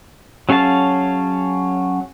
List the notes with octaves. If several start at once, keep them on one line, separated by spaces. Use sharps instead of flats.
F#3 C#4 G#4 F5 A5